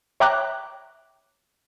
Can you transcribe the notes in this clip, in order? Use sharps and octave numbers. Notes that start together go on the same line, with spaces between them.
C#5 E5 G5 A#5 D6 F#6